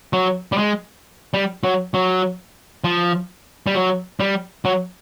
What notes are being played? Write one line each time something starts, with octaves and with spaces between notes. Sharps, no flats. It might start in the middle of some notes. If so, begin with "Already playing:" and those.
F#3
G3
G#3
G3
F#3
F#3
F3
G3
F#3
G3
F#3